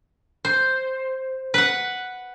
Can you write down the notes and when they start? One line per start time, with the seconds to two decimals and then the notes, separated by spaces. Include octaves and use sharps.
0.45 C5
1.54 B4 F#5